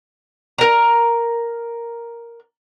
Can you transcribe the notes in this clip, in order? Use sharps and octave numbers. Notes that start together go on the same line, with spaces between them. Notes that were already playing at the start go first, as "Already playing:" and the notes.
A#4 A#5